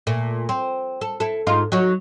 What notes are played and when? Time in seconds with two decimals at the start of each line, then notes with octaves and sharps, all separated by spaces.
0.07 A#2 A3
0.49 C4
1.01 A4
1.20 E4 A4
1.47 G#2 D#4 F4
1.72 F#3 D#4 F#4